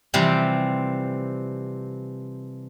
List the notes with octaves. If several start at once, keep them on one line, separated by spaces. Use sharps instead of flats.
C3 E3 F3 G3 C4